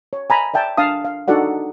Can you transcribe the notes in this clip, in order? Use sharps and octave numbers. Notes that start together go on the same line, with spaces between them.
C#5
G#5 A#5 B5
D5 E5 G5 A5
D4 F5 A5 D#6
F5
D4 D#4 F#4 A4 D5 F#5